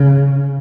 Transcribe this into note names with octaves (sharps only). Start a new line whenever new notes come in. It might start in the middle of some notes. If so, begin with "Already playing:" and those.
Already playing: C#3